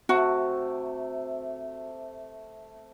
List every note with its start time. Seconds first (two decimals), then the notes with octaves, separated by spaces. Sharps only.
0.09 C3 A3 F#4